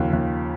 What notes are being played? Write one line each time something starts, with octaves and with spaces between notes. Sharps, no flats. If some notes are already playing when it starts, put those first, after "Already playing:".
Already playing: D#2 C#3 F3
D#2